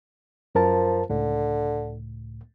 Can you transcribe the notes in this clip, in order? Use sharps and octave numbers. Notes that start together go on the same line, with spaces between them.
F#2 F3 A#4 A5
C#2 A2 D3